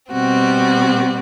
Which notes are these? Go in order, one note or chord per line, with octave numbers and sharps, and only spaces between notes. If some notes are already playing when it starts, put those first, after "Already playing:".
B2 G3 C4 F#4